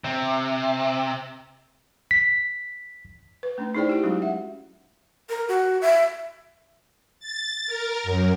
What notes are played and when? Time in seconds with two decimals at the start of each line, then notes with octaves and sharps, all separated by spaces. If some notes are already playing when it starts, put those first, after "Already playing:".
0.04 C3
2.11 B6
3.43 B4
3.58 A3 C#4 D4
3.75 D#4 E4 G#4 C5 D5 G5
3.89 E4 G4
4.03 F#3 G#3 C#4 D#4 F#4
4.22 E5 F#5
5.29 A#4
5.48 F#4
5.82 E5
7.20 A6
7.67 A#4
8.04 F#2